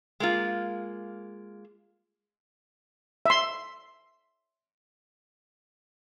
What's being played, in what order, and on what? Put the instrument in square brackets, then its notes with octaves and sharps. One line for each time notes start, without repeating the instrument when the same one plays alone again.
[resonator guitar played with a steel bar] G#3 A#3 F4
[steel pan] E5 C6